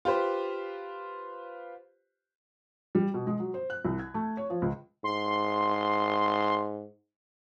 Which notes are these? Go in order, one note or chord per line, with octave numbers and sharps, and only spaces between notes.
F4 G4 B4 C5
G3
B2
G#3
F#3
C5
F#6
C2
G#6
A3
C#5
F3
C#2
G#2 C6